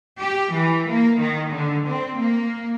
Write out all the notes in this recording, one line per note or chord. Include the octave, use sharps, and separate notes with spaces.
G4
E3
A#3
D#3
D3
C4
A#3